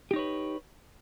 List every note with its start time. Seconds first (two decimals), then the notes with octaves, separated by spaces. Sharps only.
0.11 G4
0.13 D#4
0.16 C#5
0.19 B4